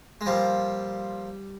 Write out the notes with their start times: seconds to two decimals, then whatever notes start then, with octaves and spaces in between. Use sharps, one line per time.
0.21 G#3
0.26 A#2 F3 G3